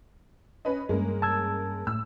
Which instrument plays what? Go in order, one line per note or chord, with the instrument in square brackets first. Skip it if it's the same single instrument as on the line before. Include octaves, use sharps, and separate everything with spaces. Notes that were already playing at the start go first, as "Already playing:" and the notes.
[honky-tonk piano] C#4 B4 D#5
[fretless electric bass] G2 [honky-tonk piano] G#3 A#3 C#4
[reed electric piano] A5 E6 G#6
[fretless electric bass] A2 [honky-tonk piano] E6